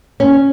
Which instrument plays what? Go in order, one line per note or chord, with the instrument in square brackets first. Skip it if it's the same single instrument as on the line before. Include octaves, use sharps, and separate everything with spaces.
[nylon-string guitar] C#4